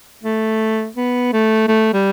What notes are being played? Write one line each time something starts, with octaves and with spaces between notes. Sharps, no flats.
A3
B3
A3
A3
G3